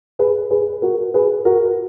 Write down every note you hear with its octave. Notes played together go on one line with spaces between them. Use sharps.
G#4 B4
G#4 B4
F#4 A#4
G#4 B4
F#4 A#4